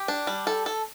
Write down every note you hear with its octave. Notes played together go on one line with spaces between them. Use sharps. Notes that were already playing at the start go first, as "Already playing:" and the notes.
Already playing: G4
D4
G3
A4
A4